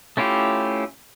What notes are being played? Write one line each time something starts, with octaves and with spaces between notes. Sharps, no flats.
A3 C#4 E4 F4 G4